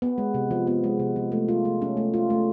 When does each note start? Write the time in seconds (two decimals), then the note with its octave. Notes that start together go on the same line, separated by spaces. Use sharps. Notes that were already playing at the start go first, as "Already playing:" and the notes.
0.02 B3
0.18 G#3
0.34 C3
0.51 F3
0.67 B3
0.84 G#3
0.99 C3
1.16 F3
1.32 A3
1.48 F4
1.65 A3
1.82 C#4
1.97 A3
2.14 F4
2.30 A3